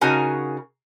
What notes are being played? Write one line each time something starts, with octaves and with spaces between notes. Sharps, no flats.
C#3 D#4 F#4 A#4 G#5